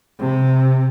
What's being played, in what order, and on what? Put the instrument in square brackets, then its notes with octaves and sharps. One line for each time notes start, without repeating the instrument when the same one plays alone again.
[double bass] C3